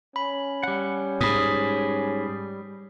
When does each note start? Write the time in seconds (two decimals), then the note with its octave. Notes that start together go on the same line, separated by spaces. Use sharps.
0.16 C#4 B5
0.63 G3 F#5
1.21 G#2 B5 D#6